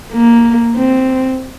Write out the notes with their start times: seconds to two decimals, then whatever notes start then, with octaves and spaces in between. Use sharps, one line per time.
0.13 A#3
0.77 C4